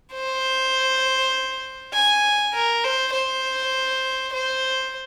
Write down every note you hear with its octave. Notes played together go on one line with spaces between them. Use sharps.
C5
G#5
A#4
C5
C5
C5